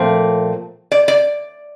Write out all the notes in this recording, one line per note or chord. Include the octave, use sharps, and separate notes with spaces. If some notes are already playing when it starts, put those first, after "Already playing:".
Already playing: A#2 F3 A3 C4
D5
D5